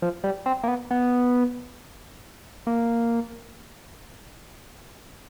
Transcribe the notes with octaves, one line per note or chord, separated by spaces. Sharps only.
F3
G3
C4
A#3
B3
B3
A#3